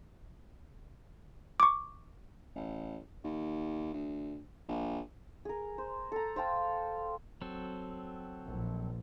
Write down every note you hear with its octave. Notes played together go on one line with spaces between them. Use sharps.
C#6 D6
A1
D#2
D2
A#1
G#4 A#4
C5
A4 A#5
C5 F5 G5 A5
F#3 C4 A4
A#1